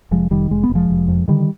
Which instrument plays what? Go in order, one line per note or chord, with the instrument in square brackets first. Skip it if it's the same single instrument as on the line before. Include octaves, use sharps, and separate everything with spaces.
[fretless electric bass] F1 F3 G#3
F1 D#3 G3
F1 G#3
B3
F1
F3 G#3
F1
F2
D3 D#3 G3